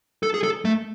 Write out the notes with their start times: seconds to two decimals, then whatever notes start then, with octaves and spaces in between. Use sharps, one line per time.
0.23 A4
0.34 G#4
0.44 A4
0.65 A3